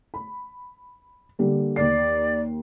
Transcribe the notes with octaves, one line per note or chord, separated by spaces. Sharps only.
B5
D3 G3 A#3
D#2 D5 C7